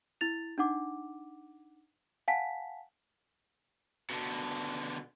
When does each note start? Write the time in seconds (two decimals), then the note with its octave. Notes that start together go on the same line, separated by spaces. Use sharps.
0.21 E4 A6 F7
0.58 D4 D#4 F#5 D6
2.28 F5 F#5 G#5 A5 B6
4.10 B2 D3